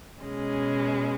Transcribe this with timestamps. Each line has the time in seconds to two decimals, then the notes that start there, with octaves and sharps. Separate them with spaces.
0.23 B2 G#3 C#4